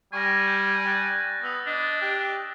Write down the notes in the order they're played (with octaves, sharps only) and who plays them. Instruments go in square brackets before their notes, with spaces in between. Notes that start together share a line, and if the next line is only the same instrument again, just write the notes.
[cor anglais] G3 [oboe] G#5 [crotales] C#6 F6 A#6
[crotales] G6
F#6 A6
[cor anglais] B3 [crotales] D#6 E6 A6
[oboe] D4 [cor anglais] D#5
[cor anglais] G4